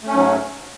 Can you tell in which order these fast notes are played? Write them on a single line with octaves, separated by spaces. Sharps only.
A3 C#4 G#2 F#3